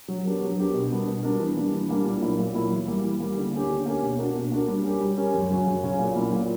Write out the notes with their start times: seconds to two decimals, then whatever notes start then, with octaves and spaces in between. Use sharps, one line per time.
0.08 F#3
0.25 B3 D4 G4 A#4
0.42 F#3
0.58 B3 D4 G4 A#4
0.74 B2
0.90 G3 B3 D4 A#4
1.07 B2
1.23 G3 B3 D4 A#4
1.40 E3
1.56 G3 A#3 D4
1.73 E3
1.89 G3 A#3 D4
2.05 A#2
2.22 F#3 A#3 E4 A#4
2.39 A#2
2.55 F#3 A#3 E4 A#4
2.71 E3
2.88 G3 A#3
3.04 E3
3.20 G3 A#3
3.38 D3
3.53 A#3 C#4 G4
3.70 D3
3.86 A#3 C#4 G4
4.02 B2
4.19 A#3 D4 F#4 A#4
4.35 B2
4.52 A#3 D4 F#4 A#4
4.68 G3
4.84 C#4 G4 A#4
5.01 G3
5.17 C#4 G4 A#4
5.34 F#2
5.50 C#3 F#3 C#4 F#4
5.67 F#2
5.83 C#3 F#3 C#4 F#4
5.99 A#2
6.16 F#3 A#3 E4
6.32 A#2